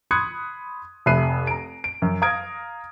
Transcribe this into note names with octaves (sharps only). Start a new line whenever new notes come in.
B5 C6 D#6 F#6 G#6 C#7
F1 E5 B5 F#6 C7 D#7
A#5 D7
D7
F#2
F5 A#5 D#6 F6 G#6 D7